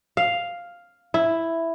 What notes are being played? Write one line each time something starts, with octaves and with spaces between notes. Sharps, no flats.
F5
E4